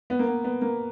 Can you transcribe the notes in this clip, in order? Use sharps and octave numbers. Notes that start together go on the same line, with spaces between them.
B3
A#3
B3
B3
A#3